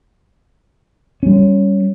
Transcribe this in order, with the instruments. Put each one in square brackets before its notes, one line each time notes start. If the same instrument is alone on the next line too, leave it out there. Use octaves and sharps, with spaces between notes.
[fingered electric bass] G3 C#4